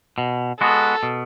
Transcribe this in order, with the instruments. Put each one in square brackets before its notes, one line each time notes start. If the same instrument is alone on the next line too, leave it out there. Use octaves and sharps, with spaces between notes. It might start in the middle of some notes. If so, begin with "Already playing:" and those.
[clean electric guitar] B2
[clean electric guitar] G#3 B3 F#4 [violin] A4
[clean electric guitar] B2